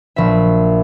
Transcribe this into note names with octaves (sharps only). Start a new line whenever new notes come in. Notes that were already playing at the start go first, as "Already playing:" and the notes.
A#1 E5